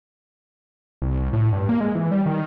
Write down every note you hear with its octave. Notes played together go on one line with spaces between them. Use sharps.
C2
C2
A2
G2
A#3
G#3
E3
G3
D#3